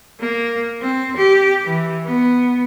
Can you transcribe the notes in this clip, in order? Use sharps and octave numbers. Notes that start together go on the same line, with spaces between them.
A#3
C4
G4
E3
B3